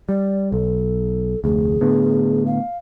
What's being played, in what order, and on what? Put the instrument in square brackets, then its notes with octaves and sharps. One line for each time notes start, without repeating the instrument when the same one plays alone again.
[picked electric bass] G3 [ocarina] D5
[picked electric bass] B1 [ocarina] A4
[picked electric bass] F1 D2 [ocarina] G#4
[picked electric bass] A2 D3 B3
[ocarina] F5